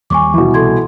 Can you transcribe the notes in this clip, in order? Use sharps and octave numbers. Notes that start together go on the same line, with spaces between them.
D#2 G3 G#5 C#6 D6
B2 E3
C2 A4 C6 G#6